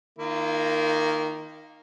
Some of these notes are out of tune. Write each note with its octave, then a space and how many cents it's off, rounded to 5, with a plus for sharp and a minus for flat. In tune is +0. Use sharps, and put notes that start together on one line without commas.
D#3 +0 A#3 +0 F4 -40